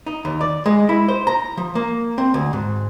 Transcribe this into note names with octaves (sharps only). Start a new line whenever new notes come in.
D#4
D#2
D5
G#3
E4
C5
A#5
F3
A#3
C4
D2
G#2